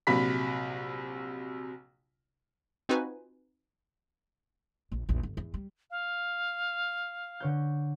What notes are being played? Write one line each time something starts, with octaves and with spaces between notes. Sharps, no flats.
A#1 C3 F#3 B5 B6
C4 D#4 F4 F#4 B4 G#5
A#1
A#1 E2
G1
E2
G3
F5
D3 C#5 G6